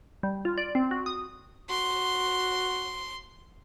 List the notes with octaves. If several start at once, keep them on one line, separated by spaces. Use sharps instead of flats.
G3
F4
D5
C4
F#4
D#6
F#4 C6